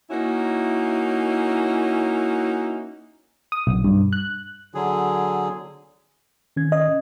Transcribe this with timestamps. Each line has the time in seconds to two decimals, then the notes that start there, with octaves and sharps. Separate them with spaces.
0.10 A#3 C#4 D#4 E4 F#4
3.52 D#6
3.67 B1
3.84 G2
4.13 F#6
4.75 D3 F#3 G#4
6.56 D#3 C#4 G#6
6.72 D#5